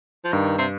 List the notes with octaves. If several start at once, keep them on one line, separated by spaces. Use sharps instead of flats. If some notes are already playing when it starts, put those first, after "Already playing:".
F3
G2 D#3
C3